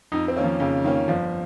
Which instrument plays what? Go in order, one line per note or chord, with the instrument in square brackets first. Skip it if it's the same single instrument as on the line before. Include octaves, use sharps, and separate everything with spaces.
[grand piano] F2 [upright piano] D#4
[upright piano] C4
[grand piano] D#3 A#3 C#4
[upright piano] F3
[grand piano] F2 [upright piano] C#3
[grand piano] D#3 A#3 C#4
[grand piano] G1 [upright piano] F3